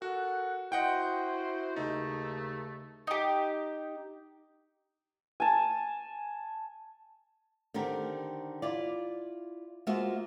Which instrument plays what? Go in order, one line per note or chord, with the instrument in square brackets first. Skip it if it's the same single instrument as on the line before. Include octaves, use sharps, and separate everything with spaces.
[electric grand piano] F#4 [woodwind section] A4 A#4 F#5
[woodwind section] E4 F#4 C5 [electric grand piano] D#5 F#5 G5
[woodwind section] D#2 C#3 A3 [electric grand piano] D#4
[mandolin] D#4 G4
[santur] G#5 A5
[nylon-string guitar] D3 D#3 C4 G4 A#4
E4 F4 D5
G#3 A#3 F4 F#4 C5 E5